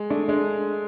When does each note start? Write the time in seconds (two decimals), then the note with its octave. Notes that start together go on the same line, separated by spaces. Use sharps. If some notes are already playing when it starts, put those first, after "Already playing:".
Already playing: G#3
0.10 A3 D4
0.28 G#3 D4